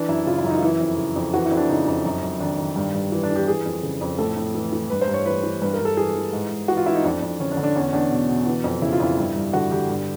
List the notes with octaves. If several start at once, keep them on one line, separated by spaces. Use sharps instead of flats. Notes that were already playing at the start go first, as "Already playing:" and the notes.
Already playing: E3 D4
F#2 E4
C#3 F4
E4
F#2
D#4
F4
E3 E4
F2
C#3
F2
E3 F#4
E4
F2
D4
C#3 D#4
F2
F#2
F#2
D#3 D4
D#3
G2
G2
E3
D4
E3
G4
E3 G#4
F2
C#3
F2
A2 A4
A2
E3
E3
G2 B4
C5
G2
C#5
E3 B4
E3
G2 B4
A#4
G2
A4
E3 G#4
E3
G#2
G#2
E3 F#4
F4
E3 E4
D#4
F2 D4
F2
D3 C#4
D4
D3
D4
E2 C#4
E2 D4
B2
B2
E3
F2
C#3 E4
F4
F2 E4
G2
G2
D3 F#4
D3 G4
G2